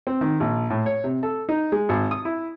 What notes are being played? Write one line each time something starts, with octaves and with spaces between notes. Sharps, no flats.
C4
D#3
A#1
A2
C#5
C3
A4
D#4
G#3
G#1
D#6
E4